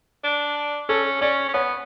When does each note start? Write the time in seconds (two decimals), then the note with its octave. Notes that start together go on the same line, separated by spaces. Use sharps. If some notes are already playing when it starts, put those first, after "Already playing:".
0.24 D4
0.89 C#4 A4
1.21 C#4 D5
1.49 C#4
1.54 B3 C#5